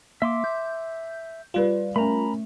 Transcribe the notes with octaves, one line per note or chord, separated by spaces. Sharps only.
A#3 E5 C6 D6
G6
G3 F4 B4 D5
A3 C#4 A#4 A#5 B5